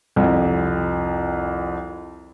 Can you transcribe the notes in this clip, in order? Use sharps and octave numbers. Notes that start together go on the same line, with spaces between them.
C2 F2